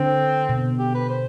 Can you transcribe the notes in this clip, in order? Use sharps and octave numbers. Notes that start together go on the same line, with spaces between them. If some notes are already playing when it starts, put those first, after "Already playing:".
Already playing: D3 C4
B2
G4
B4
C5